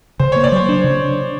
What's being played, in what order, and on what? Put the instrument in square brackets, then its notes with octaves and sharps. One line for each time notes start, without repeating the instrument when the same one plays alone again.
[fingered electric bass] C#3 [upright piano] C5
[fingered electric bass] A#3 [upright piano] C#5
[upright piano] D5
[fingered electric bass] F#3 [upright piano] C5
[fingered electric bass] D4 [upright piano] C5
[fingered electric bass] C#3